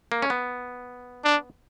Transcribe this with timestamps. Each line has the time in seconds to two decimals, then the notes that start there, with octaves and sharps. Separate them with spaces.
0.12 A#3
0.22 C#4
0.30 B3
1.25 D4